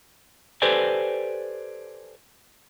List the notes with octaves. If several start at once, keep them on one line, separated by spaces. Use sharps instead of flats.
G4 A4 B4 C5 D5 G#5